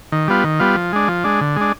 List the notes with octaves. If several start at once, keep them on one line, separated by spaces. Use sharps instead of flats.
D#3
G3 B3 F4
D#3
G3 B3 F4
F3
G#3 D4
F3
G#3 D4
D3
G#3 D4